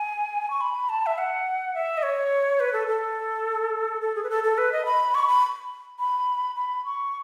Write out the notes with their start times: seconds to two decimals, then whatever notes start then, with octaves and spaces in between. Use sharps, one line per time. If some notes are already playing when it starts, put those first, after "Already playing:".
Already playing: G#5
0.50 C#6
0.61 B5
0.89 A5
1.06 E5
1.18 F#5
1.74 E5
1.97 D#5
2.03 C#5
2.60 B4
2.73 A4
2.88 A4
4.01 A4
4.15 G#4
4.23 B4
4.30 A4
4.44 A4
4.58 B4
4.72 D#5
4.85 B5
5.15 C#6
5.28 B5
5.99 B5
6.56 B5
6.85 C#6